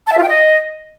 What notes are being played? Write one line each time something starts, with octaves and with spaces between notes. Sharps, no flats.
A5
E5
F4
G5
D#5